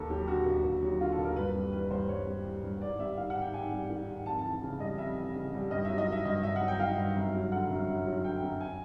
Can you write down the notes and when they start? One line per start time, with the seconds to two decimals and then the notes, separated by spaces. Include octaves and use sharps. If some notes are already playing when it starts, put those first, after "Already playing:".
Already playing: D#2 A4
0.10 F#3 G4
0.28 D3 F#4
0.46 D#2
0.64 D#2
0.83 F#3
1.00 D3 F4
1.12 A4
1.18 D#2
1.24 A#4
1.36 G2 B4
1.54 G3
1.73 E3 B4
1.91 G2 C5
2.09 G2 C#5
2.27 G3
2.45 E3
2.63 G2
2.81 G#2 D5
2.99 G3 E5
3.17 D#3 F5
3.30 F#5
3.35 G#2
3.41 G5
3.54 G#2 G#5
3.72 G3
3.89 D#3
4.08 G#2
4.26 F2 A5
4.39 A5
4.44 E3
4.62 C#3
4.80 G3 D#5
4.98 F2 E5
5.17 E3
5.34 C#3
5.53 G3
5.71 G2 D#5
5.85 E5
5.90 F#3
5.98 D#5
6.07 D#3 E5
6.25 G2 D#5
6.43 G2 E5
6.56 F#5
6.61 F#3
6.68 G5
6.79 D#3 F5
6.98 G2
7.16 F#2
7.34 F#3
7.52 D3 F#5
7.70 F#2
7.88 F#2
8.06 F#3
8.24 D3 G5
8.42 F#2
8.61 G#5